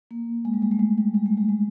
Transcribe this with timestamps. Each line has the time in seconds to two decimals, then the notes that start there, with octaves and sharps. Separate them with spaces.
0.11 A#3
0.45 G#3
0.54 G3
0.62 G#3
0.71 A3
0.79 G#3
0.98 G3
1.14 G#3
1.26 A3
1.37 G#3
1.49 G#3